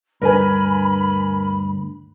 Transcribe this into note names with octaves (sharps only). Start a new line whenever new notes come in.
D2 G2 A#4 B4 G#5 B5